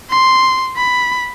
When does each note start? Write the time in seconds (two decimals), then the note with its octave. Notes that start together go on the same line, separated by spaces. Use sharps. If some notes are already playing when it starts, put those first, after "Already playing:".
0.11 C6
0.76 B5